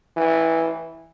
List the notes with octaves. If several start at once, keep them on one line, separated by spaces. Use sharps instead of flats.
E3